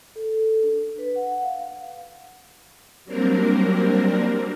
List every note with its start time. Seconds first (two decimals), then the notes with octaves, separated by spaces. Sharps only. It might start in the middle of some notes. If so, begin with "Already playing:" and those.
0.16 A4
0.63 D4
0.98 B4
1.16 F#5
1.43 F5
3.05 F#3 G3 A#3 C4 D4 A#4